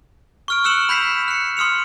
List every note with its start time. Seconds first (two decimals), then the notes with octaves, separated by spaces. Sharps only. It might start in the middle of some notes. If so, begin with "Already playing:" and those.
0.48 C#6 F6 D7
0.64 E6 F#6 C#7 E7 F#7
0.89 B5 G6 B6 C7 E7
1.28 F#6 C#7
1.57 C6 D#6 F6 C#7 F7